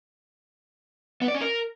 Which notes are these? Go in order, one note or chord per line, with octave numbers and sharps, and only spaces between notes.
B3
D5
C#4
A#4